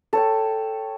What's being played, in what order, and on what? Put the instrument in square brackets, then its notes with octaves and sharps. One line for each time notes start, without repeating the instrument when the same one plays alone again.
[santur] A4 C#5 G5